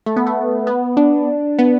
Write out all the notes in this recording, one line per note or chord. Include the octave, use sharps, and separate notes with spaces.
A3
B3
A3
B3
D4
B3